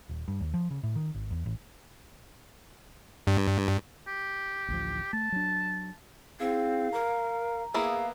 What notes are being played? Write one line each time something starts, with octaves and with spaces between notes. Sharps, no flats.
D#1
G2
D#2
F3
C#3
A2
D#3
G#1
E2
A1
G2
G4
A1 D2 F3
A3 A5
F#3 D4
C4 E4 G#4 F5
A#4 A#5
A#3 B3 E4 G#4 F5